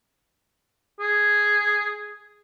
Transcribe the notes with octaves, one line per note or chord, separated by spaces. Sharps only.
G#4